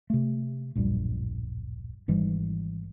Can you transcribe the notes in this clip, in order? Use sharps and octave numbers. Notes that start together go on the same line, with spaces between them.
C3 A3
D1 A#1 F#2 G3
G#1 G#2 E3 G3